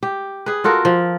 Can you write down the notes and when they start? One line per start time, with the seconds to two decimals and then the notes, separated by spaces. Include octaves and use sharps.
0.03 G4
0.46 G#4 B4
0.64 F4 F#4 A4 A#4
0.85 F3